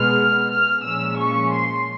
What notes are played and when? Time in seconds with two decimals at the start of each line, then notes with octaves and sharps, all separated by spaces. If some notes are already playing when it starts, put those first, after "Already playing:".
Already playing: B2 G#3 B3 F6
0.49 F6
0.83 A#2 F3 G#3 C#4 E6
1.16 C#6
1.50 C6